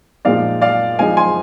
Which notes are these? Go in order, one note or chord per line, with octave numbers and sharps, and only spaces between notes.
A#2 F3 G#3 D#4 D5 F5
D5 F5
F3 G#3 D#4 F5 G#5
G#5 C6